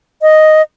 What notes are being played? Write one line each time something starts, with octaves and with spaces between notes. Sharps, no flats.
D#5